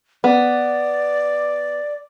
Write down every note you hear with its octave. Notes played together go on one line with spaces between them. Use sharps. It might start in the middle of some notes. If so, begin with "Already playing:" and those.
B3 D5